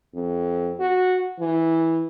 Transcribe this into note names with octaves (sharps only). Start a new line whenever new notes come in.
F2
F#4
E3